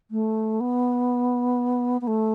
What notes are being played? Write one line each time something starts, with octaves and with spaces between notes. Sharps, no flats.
A3
B3
B3
A3